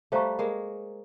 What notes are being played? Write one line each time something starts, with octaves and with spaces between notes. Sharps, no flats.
G3 A3 C5 F5 A#5 C#6
G#3 A#3